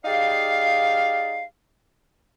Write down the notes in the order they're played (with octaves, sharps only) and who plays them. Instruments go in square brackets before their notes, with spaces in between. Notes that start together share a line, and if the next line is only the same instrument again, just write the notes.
[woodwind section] D#4 G4 G#4 D5 F5